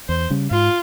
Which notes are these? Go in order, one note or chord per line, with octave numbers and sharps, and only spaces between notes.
E2 C5
C#3 G3 C#4
G#2 F4